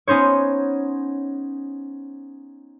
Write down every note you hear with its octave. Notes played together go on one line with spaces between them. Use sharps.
B3 C#4 D#4 C5 C#5